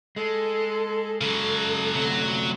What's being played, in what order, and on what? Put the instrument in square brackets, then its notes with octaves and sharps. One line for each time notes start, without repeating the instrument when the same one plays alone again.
[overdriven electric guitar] G#3 [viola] A4
[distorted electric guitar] C#3 F#3 [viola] A4
[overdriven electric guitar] D2 C3 [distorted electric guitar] F#3